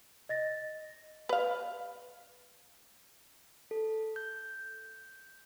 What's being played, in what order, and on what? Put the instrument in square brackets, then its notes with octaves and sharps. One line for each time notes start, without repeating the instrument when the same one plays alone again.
[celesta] D#5 A6 A#6
[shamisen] B4 F5
[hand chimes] A4
G6